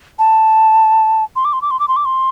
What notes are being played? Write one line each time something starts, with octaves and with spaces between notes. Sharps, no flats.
A5
C6
D6
C6
D6
C6
D6
C6
D6
C6